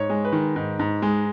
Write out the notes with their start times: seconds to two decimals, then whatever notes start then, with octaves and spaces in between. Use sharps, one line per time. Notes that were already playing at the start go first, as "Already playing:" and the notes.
Already playing: G#2 C#5
0.10 G#3
0.25 B4
0.32 D#3
0.56 G#2
0.79 G#2
1.02 G#3